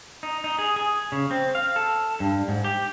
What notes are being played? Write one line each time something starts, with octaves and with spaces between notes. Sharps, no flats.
D#4
D#4
G#4
G#4
C#3
C4
F5
A4
G2
G#2
G4